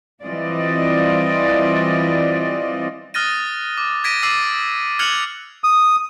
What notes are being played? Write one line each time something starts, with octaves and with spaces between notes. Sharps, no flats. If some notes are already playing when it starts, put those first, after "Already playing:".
E3 G3 C4 F4 D5 D#5
D#6 F6 F#6 A6 A#6 D#7
D6
G#6 A#6 B6 D7 D#7
D6 E6 A6 C7 D#7
F6 F#6 G#6 C#7 F7 F#7
D#6